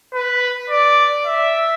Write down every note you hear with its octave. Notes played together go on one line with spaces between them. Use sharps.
B4
D5
E5